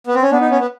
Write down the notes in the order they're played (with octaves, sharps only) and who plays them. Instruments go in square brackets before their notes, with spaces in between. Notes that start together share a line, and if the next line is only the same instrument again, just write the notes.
[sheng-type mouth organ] B3
C4
C#4
[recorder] B3 [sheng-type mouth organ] D4
[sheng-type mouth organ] D#4
C#4
B3